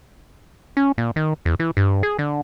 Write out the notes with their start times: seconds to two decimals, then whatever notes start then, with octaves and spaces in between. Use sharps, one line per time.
0.77 C#4
0.98 A#2
1.16 D#3
1.45 E2
1.60 E3
1.77 G2
2.03 G#4
2.19 D3